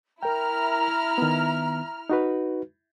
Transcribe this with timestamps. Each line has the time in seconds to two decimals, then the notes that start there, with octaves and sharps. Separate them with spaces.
0.23 E4 A#4 G5 A#5 F6
1.18 D#3 B3
2.10 D#4 F#4 B4